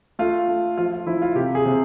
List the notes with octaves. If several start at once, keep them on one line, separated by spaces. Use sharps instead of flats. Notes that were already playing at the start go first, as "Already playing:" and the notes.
A3 F4
A3
F3 F4
F4
F3 E4
F4
C3 G4
G#4
C3